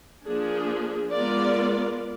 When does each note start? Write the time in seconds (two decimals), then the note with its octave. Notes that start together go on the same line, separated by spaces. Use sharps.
0.24 F3 A#3 D4 G#4
1.12 G#3 B3 F4 A#4 D5